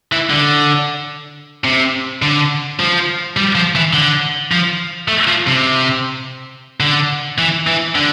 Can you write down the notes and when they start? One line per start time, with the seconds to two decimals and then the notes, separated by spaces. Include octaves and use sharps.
0.12 E3
0.30 D3
1.64 C3
2.22 D3
2.80 F3
3.37 G3
3.55 F3
3.75 E3
3.93 D3
4.52 F3
5.08 A3
5.28 F3
5.47 C3
6.80 D3
7.38 E3
7.67 E3
7.96 D3